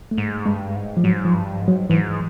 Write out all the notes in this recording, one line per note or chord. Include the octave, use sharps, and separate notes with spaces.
A3
G#2 G#3
G2 G#3
G#2
F3
G#2 F#3
F3
G2
G#2
F#3
G#2 E3